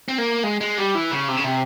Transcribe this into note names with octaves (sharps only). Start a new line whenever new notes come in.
C4
A#3
G#3
G#3
G3
E3
C#3
C3
C#3
C3